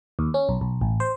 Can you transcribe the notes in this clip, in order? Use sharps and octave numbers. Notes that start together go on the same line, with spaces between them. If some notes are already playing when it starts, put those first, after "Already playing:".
D#2
C#4
B1
B1
A1
C5